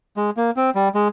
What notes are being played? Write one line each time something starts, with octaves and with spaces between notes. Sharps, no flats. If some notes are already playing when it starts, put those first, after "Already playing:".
G#3
A#3
C4
G3
G#3